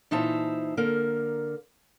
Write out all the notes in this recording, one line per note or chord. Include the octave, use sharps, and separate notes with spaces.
A#2 E3 D#4 C5 E5 A5
D3 A#3 A#4